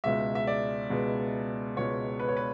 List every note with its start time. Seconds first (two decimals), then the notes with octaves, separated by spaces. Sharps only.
0.04 C#2 B2 G#3 E5
0.35 E5
0.47 D5
0.90 C#2 B2 G#3
1.77 C#2 B2 G#3 C#5
2.20 B4
2.28 C#5
2.37 B4